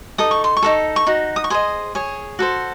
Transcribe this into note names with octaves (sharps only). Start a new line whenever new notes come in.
D#4 A4 D#6
C#6
C6
C#6
D#4 F#4 A4
C#6
D#4 F#4
D#6
C#6
G#4 C5 D#5 C6
G#4 C#5
F#4 A4 C5